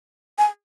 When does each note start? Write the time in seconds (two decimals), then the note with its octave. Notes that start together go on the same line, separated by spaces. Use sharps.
0.38 G#5